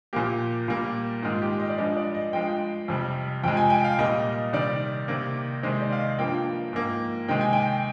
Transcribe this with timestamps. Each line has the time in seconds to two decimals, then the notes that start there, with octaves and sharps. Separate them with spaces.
0.13 A#2 F3 A#3 G4
0.68 A#2 G3 A#3
1.23 G#2 D#3 G#3 F4
1.42 G4
1.60 D#5
1.69 D5
1.78 G2 F3 G#3 D#5
1.97 D5
2.15 D#5
2.33 G2 F3 G#3 G5
2.88 F2 C3 G3
3.43 F2 C3 F3 G#3 G5
3.57 G#5
3.70 G5
3.84 F5
3.99 A#2 G3 A#3 D#5
4.53 C3 D#3 G3 D5
5.08 C3 D#3 A#3
5.63 C3 D#3 G#3 C5
5.82 D5
5.92 F5
6.00 D#5
6.19 G2 F3 A#3 G5
6.73 G#2 F3 A#3
7.28 C3 D#3 G#3 G5
7.41 G#5
7.53 G5